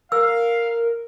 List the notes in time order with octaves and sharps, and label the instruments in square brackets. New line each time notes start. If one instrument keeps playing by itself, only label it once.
[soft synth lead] A#4 [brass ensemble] F5 [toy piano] E6